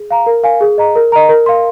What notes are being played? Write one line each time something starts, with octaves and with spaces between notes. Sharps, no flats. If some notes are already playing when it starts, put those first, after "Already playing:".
Already playing: G#4
F5 A#5
A#4
F5 G#5
G#4
D#5 A#5
A#4
D#5 A#5
A#4
F5 C6